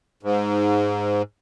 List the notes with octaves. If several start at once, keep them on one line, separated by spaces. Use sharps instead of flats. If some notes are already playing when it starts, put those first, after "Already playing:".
G#2